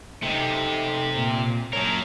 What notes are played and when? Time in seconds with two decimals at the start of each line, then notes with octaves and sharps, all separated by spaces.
0.22 C3 A3 D#4
1.16 A#2
1.73 F#3 A#4 C#5 A5